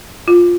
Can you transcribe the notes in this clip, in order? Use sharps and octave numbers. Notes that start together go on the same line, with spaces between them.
F4